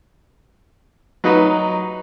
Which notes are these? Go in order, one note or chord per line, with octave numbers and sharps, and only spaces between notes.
F#3 D#4 B4